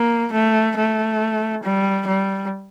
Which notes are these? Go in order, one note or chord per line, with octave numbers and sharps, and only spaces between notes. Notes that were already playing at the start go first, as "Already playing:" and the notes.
Already playing: A#3
A3
A3
G3
G3